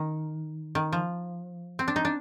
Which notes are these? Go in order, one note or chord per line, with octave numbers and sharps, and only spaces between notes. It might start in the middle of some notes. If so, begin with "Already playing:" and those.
Already playing: D#3
D#3
F3
C4
D4
D#4
D4